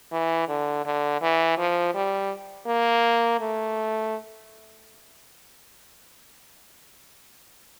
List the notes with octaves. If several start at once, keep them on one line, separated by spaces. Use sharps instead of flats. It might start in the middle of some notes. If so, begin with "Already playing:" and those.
E3
D3
D3
E3
F3
G3
A#3
A3